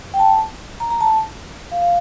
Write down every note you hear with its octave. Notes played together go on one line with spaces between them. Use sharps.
G5
A5
A#5
A#5
A5
F5
F5